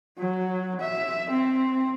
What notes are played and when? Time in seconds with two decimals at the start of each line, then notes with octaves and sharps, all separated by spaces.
0.18 F#3
0.80 E5
1.30 C4